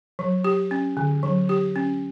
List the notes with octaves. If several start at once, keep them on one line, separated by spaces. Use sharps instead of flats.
F#3
G4
C#4
D3
F#3
G4
C#4